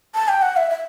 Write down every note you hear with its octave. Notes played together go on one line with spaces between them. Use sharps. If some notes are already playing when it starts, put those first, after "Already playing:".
A5
G5
F#5
E5
E5